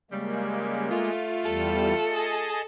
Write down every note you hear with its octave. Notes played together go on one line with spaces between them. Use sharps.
C#3 G3 G#3 A#3
A3 F4
E2 G3 A4
G#4 D#5 A5